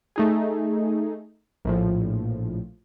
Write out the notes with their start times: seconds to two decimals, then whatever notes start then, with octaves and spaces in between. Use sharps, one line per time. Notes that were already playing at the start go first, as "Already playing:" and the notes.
0.16 A3 D#4 G#4
1.65 A#1 A2 F3